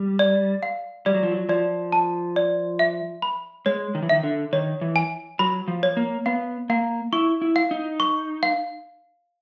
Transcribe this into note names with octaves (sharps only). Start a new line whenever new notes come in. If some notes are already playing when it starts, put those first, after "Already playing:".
Already playing: G3
D5
F5
G3 D5
F#3
F3
F#3
F3 D5
A5
D5
E5
B5
G#3 C#5
D#3
E3
D#3 E5
D3
D#3 C#5
E3
G#5
F#3 B5
F3
C#5
A#3
B3 F5
A#3 F5
E4 C#6
E4
F5
D#4
C#6
F5